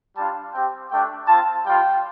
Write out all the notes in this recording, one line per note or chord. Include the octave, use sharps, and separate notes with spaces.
G3 D4 F4 A5
C4 G4 G5
A3 D4 G4 G5
C4 F4 A5
G3 F4 G5